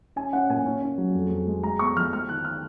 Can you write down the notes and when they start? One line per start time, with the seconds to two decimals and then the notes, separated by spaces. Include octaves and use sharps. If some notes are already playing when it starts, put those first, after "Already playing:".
0.16 C#4 G#5
0.33 C#4 F#5
0.49 A#2 G#5
0.66 C#4
0.82 C#4
0.98 F#3
1.14 F2
1.31 F2
1.47 G#3
1.63 G#3 A#5
1.79 B3 C#6
1.96 F3 F6
2.12 G#3 F6
2.29 D#3 F#6
2.45 F6